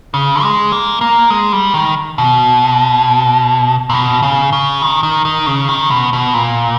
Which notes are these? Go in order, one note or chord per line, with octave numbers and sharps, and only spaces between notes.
C#3
G#3
A#3
A#3
G#3
G3
D#3
B2
A#2
B2
C#3
C#3
D#3
D#3
D#3
C#3
D#3
B2
B2
A#2